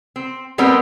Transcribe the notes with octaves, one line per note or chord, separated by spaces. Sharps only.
C4
A2 G3 B3 C4 A#4